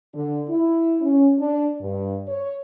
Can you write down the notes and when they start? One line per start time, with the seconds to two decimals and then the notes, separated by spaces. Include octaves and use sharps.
0.14 D3
0.49 E4
1.02 C#4
1.38 D4
1.81 G2
2.28 C#5